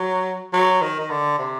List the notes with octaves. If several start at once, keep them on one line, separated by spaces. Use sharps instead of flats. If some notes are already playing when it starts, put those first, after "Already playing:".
Already playing: F#3
F#3
D#3
D#3
D3
C3